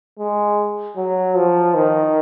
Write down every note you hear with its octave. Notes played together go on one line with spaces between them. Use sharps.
G#3
F#3
F3
D#3